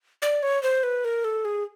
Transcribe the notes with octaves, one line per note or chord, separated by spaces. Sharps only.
D5
C#5
C5
B4
A#4
A4
G#4